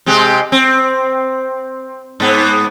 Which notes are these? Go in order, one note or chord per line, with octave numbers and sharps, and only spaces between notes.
C3 G#3 G4
C4
G#2 B3